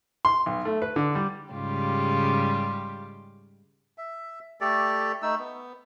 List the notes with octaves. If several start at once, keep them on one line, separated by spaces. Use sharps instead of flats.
C6
B1
A3
B4
D3
G3
G#2 C#3 G3 F4 G4
E5
A3 G4 A4 D5
A3 D#4 E6
B3